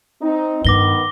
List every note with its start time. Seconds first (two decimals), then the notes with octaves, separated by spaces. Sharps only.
0.22 C4 D#4
0.65 G2 D#3 B3 D6 A#6 G7